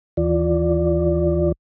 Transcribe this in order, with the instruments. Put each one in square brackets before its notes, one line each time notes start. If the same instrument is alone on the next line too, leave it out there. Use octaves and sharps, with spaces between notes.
[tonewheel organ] D#2 E3 F4 D5